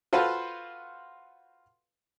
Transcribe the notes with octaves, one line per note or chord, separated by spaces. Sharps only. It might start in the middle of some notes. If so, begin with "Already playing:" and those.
F4 F#4 A4 B4 C5 F5